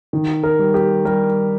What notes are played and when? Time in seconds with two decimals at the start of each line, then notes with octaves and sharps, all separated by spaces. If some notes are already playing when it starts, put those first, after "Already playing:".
0.13 D#3
0.43 A#4
0.59 G3
0.74 G4
1.05 G3 A#4